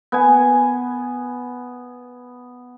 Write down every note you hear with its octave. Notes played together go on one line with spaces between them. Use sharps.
B3 G#5